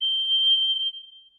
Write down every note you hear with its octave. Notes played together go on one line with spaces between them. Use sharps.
G7